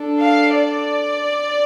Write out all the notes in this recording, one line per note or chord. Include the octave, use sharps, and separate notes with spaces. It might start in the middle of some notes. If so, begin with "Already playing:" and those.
Already playing: D4 A4
F5
D5